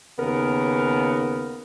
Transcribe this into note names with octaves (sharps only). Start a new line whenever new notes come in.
D#2 C#3 B3 A#4